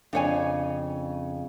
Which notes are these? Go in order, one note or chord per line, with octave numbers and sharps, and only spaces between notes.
F2 C#3 D4 C#5 G#5